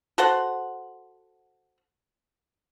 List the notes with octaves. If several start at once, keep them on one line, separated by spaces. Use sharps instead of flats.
F#4 A4 C5 F#5